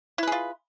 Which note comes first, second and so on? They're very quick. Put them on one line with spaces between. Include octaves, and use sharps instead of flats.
E4 B4 G#4 F4